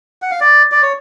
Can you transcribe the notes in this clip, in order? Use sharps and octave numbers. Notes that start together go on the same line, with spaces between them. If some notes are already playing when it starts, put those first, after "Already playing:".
F#5
F5
D5
D5
C#5